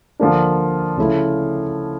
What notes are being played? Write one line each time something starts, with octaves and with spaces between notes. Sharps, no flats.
D3 F3 A#3 D4
C#3 F3 A3 C#4 E4